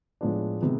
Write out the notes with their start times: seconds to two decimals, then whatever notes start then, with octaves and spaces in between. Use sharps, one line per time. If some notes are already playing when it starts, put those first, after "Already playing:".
0.21 A2 F3 G#3 B3 D4
0.61 C3 D#3 G#3 B3